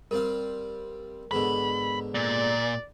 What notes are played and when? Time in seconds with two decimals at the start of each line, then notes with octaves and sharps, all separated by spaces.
0.11 G3 C4 A#4 F5
1.31 G#2 B2 D3 B5
2.15 A#2 D5